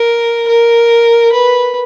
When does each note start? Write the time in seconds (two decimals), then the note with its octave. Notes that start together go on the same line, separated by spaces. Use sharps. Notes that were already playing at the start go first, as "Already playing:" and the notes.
Already playing: A#4
0.48 A#4
1.32 B4